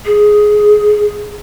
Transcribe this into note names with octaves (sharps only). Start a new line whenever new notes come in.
G#4